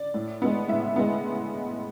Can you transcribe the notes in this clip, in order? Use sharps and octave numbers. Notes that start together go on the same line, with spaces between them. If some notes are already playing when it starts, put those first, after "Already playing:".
Already playing: D5
A2
G#3 B3
A2 E5
G#3 B3